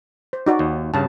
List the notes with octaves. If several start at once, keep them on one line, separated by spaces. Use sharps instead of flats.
C5
D#4 F#4 D5
D#2
G2 C#3 A5